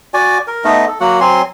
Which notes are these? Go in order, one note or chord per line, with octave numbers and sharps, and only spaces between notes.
F#4 D5 G#5
A#4
A3 B3 D#4 D#5
A4
F#3 A#3 F#4 F#5
F#3 C4 G#5 C6